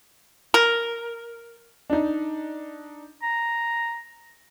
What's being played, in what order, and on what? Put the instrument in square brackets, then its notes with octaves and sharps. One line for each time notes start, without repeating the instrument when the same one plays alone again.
[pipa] A#4
[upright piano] D4 D#4
[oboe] A#5